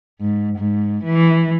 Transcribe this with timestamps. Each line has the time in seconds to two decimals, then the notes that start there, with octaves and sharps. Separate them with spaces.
0.21 G#2
0.58 G#2
1.04 E3